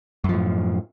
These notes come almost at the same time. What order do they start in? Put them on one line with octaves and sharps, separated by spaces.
F#2 F3 A2